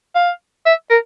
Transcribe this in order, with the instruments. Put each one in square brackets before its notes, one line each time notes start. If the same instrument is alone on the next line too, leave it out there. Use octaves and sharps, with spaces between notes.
[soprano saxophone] F5
E5
A#4